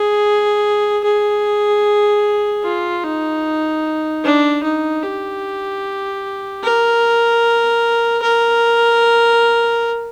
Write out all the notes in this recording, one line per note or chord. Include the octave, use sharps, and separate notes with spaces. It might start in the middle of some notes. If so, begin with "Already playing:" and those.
Already playing: G#4
G#4
F4
D#4
D4
D#4
G4
A#4
A#4